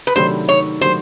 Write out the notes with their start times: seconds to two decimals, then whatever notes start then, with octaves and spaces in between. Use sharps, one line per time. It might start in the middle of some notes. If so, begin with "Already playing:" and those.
0.07 B4
0.16 C3 D#3 F#3 A3 D4 C5
0.49 C#5
0.81 C3 D#3 F#3 A3 D4 C5